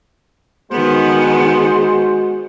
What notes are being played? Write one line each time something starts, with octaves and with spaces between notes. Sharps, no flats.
D#3 G#3 B3 F#4 G#4 C5